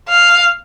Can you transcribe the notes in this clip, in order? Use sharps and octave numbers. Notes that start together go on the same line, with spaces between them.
F5